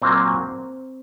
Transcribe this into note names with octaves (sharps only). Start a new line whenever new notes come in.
A#2 F#3 A#3 C4